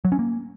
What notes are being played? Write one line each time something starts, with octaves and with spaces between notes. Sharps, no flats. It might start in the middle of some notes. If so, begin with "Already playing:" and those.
F#3
C#4
A#3